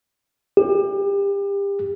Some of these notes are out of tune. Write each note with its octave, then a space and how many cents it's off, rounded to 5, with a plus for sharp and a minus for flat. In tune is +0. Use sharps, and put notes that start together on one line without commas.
G4 +30